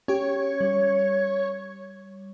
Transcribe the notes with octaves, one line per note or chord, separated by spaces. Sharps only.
C#4 G4 C#5
G3